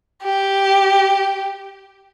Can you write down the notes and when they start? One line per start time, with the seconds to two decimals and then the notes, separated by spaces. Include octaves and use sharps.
0.23 G4